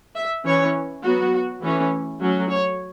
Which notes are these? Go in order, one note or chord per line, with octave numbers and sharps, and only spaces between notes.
E5
E3 C#4 C#5
F#3 B3 F#4
E3 A3 C#4
F#3 A3 C#4
C#5